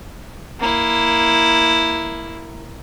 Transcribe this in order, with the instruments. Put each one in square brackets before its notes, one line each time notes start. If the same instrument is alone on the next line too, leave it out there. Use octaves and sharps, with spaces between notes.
[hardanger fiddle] A#3 E4